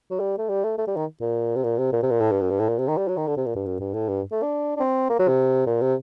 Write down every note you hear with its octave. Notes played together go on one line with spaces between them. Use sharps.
F#3
G3
A3
G3
A3
A3
G3
D#3
A#2
C3
A#2
C3
A#2
C3
A#2
A2
G2
F#2
G2
A2
A#2
C3
D#3
G3
F#3
D#3
D3
C3
A#2
G2
F#2
G2
A2
G2
A3
D4
D4
C4
A#3
F#3
C3
A#2
C3